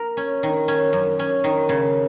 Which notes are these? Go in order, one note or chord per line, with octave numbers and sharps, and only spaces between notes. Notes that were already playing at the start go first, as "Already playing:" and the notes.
Already playing: A#3 A#4
C#4
D#3
C#4
F#2
C#4
D#3
C#3